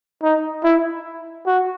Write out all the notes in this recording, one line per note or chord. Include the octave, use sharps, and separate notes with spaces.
D#4
E4
F#4